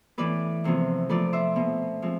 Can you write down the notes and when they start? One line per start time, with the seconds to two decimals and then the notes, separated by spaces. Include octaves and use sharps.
0.18 A2 E3 B3 B4 D5
0.64 E2 C3 F3 B3
1.09 C3 F3 A3 B4 D5
1.33 C5 E5
1.56 B2 B3
2.02 F3 G#3 C4